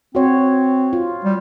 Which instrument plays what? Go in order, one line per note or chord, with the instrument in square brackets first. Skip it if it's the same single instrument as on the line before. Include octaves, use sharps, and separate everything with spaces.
[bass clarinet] C4 [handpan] F#4 C#5
[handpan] F4
[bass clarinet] G3